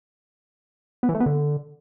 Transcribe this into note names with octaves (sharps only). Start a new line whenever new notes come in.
B3
E3
A3
B3
D3